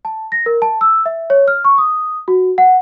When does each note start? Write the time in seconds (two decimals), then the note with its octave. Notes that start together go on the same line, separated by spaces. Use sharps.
0.05 A5
0.32 A#6
0.46 A#4
0.62 A5
0.81 E6
1.06 E5
1.30 C#5
1.48 F6
1.64 C#6
1.78 D#6
2.28 F#4
2.58 F#5